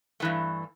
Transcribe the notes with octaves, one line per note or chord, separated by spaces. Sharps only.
G2 E3 A3